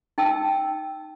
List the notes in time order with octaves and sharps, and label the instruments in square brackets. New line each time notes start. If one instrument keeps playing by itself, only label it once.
[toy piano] D#4 G5 A5 E6